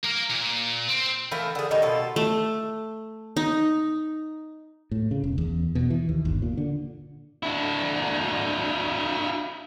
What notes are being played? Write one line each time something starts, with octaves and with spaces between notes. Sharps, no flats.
A#3 A#4
A#2
C4
E3 F3 A3 A#4
D3 G#4
A2 D#3 G3 D#4
B2 F4 A4
A3
D#4
A2
C#3
E1
E2
B2
E3
D#2
G1
A#2
D3
D4 E4